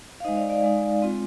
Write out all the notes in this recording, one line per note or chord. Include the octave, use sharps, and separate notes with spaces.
F5
G#3 D#4 C5 D#5
D5 F5
D5 F5
G#3 D#4
G#3 C4 F4